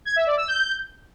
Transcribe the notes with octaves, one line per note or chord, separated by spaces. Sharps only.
G#6
E5
D5
E6
G6